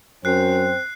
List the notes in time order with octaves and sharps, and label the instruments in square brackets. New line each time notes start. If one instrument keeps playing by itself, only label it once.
[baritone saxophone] F#2 [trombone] C4 [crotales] F#6 C7